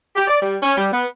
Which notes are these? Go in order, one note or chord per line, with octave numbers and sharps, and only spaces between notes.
G4
D5
G3
C#4
G3
B3